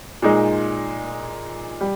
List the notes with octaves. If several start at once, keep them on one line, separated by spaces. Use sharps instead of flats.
A#2 G#3 D#4
G3